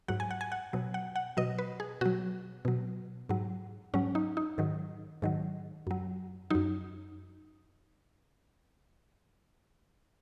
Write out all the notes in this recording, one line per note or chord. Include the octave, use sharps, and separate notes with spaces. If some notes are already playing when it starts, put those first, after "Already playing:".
G#2 F#3 F#5
G#5
F#5
G#5
F#5
B2 F#3
F#5
F#5
B2 F#3 D#5
B4
G#4
B2 F#3 F#4
B2 F#3
G#2 F#3
G#2 F#3 C#4
D#4
D#4
G#2 D#3 F#3
G#2 D#3 F#3
F#2 F#3
F#2 F#3 D#4